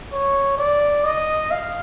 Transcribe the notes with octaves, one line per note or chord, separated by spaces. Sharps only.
C#5
D5
D#5
F5